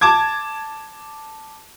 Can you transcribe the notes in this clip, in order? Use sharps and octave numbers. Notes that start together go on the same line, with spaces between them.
A5 D6 G#6